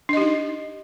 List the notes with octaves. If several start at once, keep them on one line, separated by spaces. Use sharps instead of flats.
D4 D#4 G4 D#5